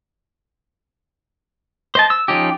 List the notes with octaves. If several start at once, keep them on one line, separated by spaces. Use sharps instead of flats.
C5 D#5 A5
E6
F3 C#4 D#4 G4